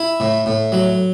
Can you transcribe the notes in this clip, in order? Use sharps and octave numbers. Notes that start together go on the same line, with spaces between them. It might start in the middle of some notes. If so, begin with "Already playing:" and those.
Already playing: E4
A2
A2
F#3